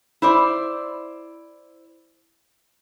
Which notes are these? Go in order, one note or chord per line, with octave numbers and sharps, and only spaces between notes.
E4 C5 D5